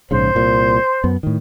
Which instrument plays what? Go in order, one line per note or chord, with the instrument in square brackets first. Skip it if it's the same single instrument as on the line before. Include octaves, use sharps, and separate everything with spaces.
[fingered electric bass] A#1 G#2 C#3 [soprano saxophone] C5
[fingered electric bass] C2 A#2
F#2 B3
A2 D#3